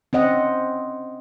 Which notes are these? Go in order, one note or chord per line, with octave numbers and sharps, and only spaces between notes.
C4 C#4 D#5 F#5